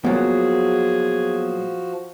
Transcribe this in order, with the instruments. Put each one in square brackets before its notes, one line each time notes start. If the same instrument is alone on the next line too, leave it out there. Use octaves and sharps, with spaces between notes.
[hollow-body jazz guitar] A#2 F#3 [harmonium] F3 F#4 [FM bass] B3 [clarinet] G#4